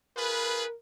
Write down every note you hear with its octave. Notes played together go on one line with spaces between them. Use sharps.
F4 G#4 A#4 B4